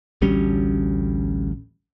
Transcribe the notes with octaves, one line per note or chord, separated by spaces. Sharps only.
A1 D2 G3 C#4